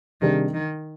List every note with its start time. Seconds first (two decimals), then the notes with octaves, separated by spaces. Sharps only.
0.21 C3 D#3 G3 D4 G#4
0.54 D#3